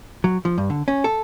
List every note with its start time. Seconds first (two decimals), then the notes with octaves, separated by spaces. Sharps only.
0.24 F#3
0.45 F3
0.58 G2
0.70 D3
0.88 C#4
1.04 A4